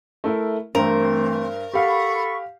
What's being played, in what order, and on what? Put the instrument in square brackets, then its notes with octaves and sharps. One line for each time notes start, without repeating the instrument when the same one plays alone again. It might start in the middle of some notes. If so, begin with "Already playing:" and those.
[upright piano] A3 E4 A#4
[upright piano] G2 C5 F7 [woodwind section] E3 A3 C4 [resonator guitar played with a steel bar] A#4
[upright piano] G4 F5 F#5 [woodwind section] A4 B5 C#6